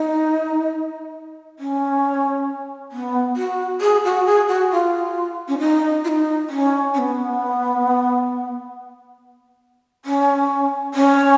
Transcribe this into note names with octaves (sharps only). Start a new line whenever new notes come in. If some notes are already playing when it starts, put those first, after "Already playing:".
Already playing: D#4
C#4
B3
F#4
G#4
F#4
G#4
F#4
F4
C#4
D#4
F4
D#4
C#4
C#4
B3
C#4
C#4